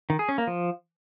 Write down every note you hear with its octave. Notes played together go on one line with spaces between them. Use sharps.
D#3
G#4
C#4
A#3
F3